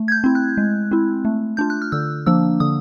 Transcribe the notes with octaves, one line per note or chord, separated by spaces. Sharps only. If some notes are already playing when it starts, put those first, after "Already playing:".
Already playing: A3
G#6
G6
C4 E4
F#6
G#3
C4 E4
A3
D4 F4 G6
F#6
F6
D3 E6
F3 A#3 D4 E6
D3 D#6